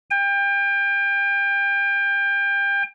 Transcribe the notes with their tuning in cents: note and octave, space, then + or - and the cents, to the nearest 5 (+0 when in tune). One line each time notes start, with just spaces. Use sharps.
G5 +30